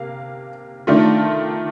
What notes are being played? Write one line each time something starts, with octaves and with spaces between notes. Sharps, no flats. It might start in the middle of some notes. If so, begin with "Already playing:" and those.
Already playing: C3 A#3 F5
D#3 A3 D4 F4